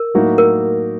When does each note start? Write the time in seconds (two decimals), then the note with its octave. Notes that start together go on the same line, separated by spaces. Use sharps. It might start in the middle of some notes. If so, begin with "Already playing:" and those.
Already playing: A#4
0.14 A2 F#3 A#3 D#4 F#4
0.38 A#4